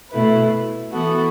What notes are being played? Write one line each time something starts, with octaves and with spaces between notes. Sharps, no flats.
B2 A3 E4 B4
E3 B3 F#4 A4